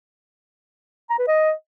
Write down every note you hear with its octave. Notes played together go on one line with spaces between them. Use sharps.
A#5
B4
D#5